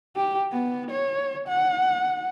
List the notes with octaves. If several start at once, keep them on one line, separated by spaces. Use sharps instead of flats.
G4
B3
C#5
F#5